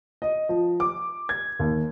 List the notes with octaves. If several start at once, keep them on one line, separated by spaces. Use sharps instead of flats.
D#5
F3
D6
G#6
D#2